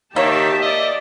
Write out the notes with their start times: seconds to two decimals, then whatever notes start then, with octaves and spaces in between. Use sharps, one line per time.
0.16 D#3 A#3 G4 C#5 E5 A5
0.62 D5 D#5